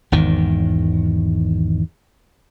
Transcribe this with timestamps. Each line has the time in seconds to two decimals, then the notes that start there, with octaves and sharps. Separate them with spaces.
0.12 G#1 E2 D#3